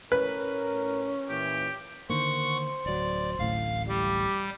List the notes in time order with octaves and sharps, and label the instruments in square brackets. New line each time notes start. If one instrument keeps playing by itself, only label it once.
[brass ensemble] A2 A#4 [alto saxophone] C#4 [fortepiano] B4
[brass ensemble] A#2 E3 [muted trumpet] G4
[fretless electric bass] D3 D#3 A#3 [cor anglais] C5 [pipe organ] F#5 C#6
[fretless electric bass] D1 F#3 [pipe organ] D5
[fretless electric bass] D1 A1 A2 [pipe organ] F5
[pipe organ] G3 [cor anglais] G4